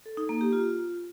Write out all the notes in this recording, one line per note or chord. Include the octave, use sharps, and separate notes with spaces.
A4
D#4
A#3
G4
F4